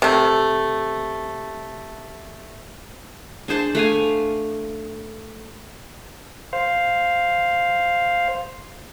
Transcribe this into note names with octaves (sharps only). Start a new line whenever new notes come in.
C3 A3
D4 G#4 C5 A5
A3 F5 G#5
C5 F5